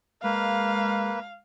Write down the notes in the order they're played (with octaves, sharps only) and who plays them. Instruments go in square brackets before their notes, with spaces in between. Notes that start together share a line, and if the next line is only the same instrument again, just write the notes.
[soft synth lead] G#3 [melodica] A#3 B4 [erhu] F5